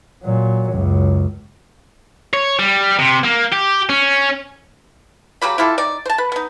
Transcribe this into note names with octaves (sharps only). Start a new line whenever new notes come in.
A#2 F#3
C#2 F#2
C#5
G3
C3
A#3
G4
C#4
C#3 F#3 G4 B5
E4 F4 G4 A4
D#4 D5
C5 A5
B4
B3 D#4